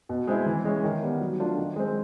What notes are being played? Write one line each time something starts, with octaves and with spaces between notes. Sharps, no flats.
B2
G#3 C4 E4
E3
G#3 C#4
D#3
G3 B3
F#3
A3 D4 F4
D#3
G#3 C4